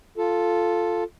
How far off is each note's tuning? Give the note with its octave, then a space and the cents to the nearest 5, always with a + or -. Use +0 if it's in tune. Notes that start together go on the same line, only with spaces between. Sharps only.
F4 +0 A4 +0